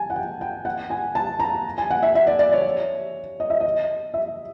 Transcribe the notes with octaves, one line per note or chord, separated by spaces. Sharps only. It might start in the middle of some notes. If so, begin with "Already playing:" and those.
Already playing: G#5 A5
F#5
G5
G5
F#5
G#5
A5
A#5
G#5
F#5
E5
E5
D5
D5
C#5
D#5
E5
D#5
E5